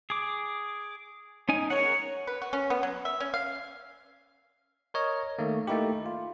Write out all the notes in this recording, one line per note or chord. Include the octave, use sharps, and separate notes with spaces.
G#4 D6
C#4 D#4 G#5
G#4 A#4 C#5 F#5
B4
F#4
C#4
B3
F#3
E5
C#4
F5
A#4 C#5 D#5
D#3 A3 A#3
A3 A#3 D#4 E4 G4
F4